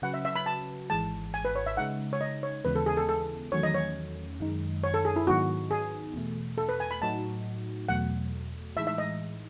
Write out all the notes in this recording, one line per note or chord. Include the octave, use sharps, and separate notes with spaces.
C#3 F#3 C#4 F#4 B4 F#5
E5
E5
B5
A5
G#1 G#2 E3 G#3 A5
G#5
B4
C#5
E5
C#3 G#3 D#4 F#5
C#5
D#5
C#5
D#2 C#3 E3 G#3 B3 B4
A4
G#4
A4
A4
E2 D#3 F#3 A3 C#4 C#5
D#5
C#5
F#2 D#3 G#3 D#4
C#5
A4
G#4
E4
G#2 D#3 F#3 B3 D#4 F#4
G#4
E2 B2 A3
A4
B4
G#5
B5
A2 F#3 A3 D#4 F#4 A5
E2 B2 F#3 A3 F#5
A2 E3 G#3 D#4 E5
E5
D#5